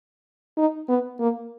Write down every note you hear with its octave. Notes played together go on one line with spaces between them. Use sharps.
D#4
B3
A#3